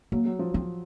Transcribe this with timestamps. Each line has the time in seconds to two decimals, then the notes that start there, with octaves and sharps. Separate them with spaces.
0.12 F#3 A#3
0.26 F#3
0.39 F3
0.54 F3 C4